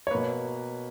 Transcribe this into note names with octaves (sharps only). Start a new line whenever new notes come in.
C#5
B2 A#3 B4